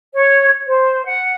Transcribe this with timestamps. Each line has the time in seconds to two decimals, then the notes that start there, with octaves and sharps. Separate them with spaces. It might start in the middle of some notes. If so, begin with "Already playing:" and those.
0.14 C#5
0.67 C5
1.05 F#5